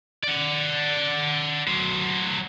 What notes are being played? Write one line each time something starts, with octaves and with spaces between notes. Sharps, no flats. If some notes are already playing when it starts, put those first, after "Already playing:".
D5 F#5
F#3 C5